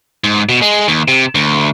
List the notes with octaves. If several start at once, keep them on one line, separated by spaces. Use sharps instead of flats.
G#2
B2
G#3
D#2
C3
D2